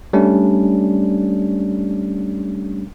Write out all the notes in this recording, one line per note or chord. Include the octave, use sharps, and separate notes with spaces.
G3 A3 C#4 D4